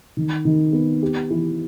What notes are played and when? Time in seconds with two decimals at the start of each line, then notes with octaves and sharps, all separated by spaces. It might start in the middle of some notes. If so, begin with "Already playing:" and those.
0.17 D#3
0.45 D#3
0.73 B3
1.02 G4
1.30 E3